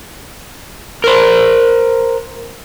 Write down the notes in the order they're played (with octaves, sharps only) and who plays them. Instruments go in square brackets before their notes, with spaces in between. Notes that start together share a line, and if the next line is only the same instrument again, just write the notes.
[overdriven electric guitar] A#4 C5